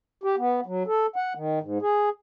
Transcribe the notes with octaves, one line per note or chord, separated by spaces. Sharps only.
G4
B3
F#3
A4
F#5
D#3
G#2
G#4